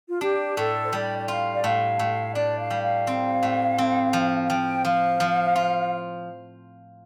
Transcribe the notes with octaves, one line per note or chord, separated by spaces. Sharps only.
F4
D4 G4
A2 A4
C5
G3 D5
D5
F4 F5
D5
A2 F5
A2
D4 D5
F5
G3
F5
C4
A2
C4
F3
F3 G5
F3 F5
F3
F4